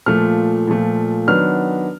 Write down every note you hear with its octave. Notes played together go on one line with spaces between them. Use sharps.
A#2 F3 A3 F6
A#2 F3 A3
D#3 F#3 B3 D4 F6